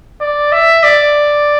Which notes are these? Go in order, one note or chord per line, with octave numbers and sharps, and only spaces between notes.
D5
E5
D5